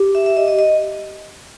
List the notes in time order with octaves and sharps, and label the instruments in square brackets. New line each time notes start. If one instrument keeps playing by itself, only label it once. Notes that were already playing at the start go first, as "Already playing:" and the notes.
Already playing: [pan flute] G4
[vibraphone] E5
E5
D#5
D#5
D#5